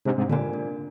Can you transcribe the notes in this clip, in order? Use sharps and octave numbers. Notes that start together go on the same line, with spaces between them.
G#2 C3 D4
G#2 C3
A#2 D3 F4 A#4 D5 G#5
D4